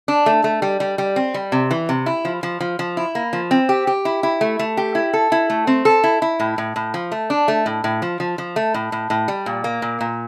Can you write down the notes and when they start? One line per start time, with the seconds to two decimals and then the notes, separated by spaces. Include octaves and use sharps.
0.08 D4
0.26 A3
0.44 A3
0.62 G3
0.80 G3
0.98 G3
1.16 C4
1.34 G3
1.52 C3
1.71 E3
1.89 C3
2.06 E4
2.25 F3
2.43 F3
2.60 F3
2.79 F3
2.97 E4
3.15 A#3
3.33 F3
3.51 C4
3.69 G4
3.87 G4
4.05 E4
4.23 E4
4.41 A3
4.59 A3
4.77 G4
4.95 E4
5.13 A4
5.32 E4
5.50 A3
5.67 C4
5.85 A4
6.04 E4
6.22 E4
6.40 A2
6.58 A2
6.76 A2
6.94 F3
7.12 A3
7.30 D4
7.48 A3
7.66 A2
7.84 A2
8.02 F3
8.20 F3
8.38 F3
8.56 A3
8.74 A2
8.92 A2
9.10 A2
9.28 G3
9.46 A#2
9.64 A#3
9.82 A#2
10.01 A#2